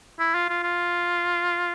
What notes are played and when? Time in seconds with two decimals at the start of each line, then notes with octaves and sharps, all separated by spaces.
0.19 E4
0.35 F4
0.49 F4
0.63 F4